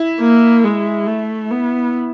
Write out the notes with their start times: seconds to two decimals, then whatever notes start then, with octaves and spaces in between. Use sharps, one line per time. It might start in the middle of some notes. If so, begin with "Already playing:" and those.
Already playing: E4
0.20 A#3
0.65 G#3
1.07 A3
1.51 B3